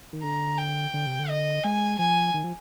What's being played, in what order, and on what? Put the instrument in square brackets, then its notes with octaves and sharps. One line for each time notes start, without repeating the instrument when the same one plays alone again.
[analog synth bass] D#3
[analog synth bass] D3 [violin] A#5
[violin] G5
[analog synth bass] D3
C3
D3
[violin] D#5
[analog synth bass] G#3 [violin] G#5
[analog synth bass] F3 [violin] G#5
[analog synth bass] D#3
F3